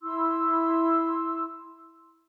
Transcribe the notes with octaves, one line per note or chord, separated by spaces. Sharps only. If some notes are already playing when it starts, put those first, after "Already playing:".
E4 C6 E6